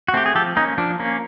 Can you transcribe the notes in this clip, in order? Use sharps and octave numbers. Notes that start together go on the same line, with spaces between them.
F#4
A3 C4 G4
G#4
F3 G4 A4
A#3 C#4 D#4
F3 D4
A#3 C#4